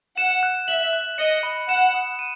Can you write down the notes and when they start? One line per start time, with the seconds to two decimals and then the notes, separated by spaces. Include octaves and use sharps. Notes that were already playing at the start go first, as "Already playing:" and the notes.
0.17 F#5 E7
0.43 F#6
0.68 E5 F#7
0.93 F#6
1.18 D#5 C#7
1.43 B5
1.69 F#5 E7
1.94 D#6
2.19 D#7